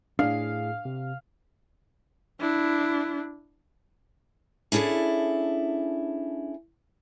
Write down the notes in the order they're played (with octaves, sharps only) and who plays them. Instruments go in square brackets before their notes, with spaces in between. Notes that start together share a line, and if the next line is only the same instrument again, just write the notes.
[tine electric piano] A2 G#4 C7 [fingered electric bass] D4 [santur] F5
[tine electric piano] C3
[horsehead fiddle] D4 E4
[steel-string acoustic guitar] C#4 D4 E4 G#4 A4